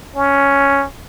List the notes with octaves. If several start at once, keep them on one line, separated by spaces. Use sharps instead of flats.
C#4